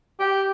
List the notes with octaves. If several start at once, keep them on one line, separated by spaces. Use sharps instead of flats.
G4